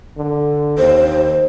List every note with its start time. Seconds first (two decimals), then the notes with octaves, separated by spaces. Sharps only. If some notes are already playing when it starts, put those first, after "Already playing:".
0.17 D3
0.78 D#2 C5